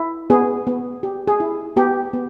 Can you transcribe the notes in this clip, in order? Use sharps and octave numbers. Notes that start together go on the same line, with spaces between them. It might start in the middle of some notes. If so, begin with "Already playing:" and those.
Already playing: E4
B3 G#4
B3
G4
G#4
E4
B3 G4
B3